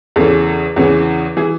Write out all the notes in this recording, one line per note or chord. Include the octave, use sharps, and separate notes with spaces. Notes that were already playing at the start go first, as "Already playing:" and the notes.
E2 C#3 E3 A4
E2 C#3 E3
E3 G#4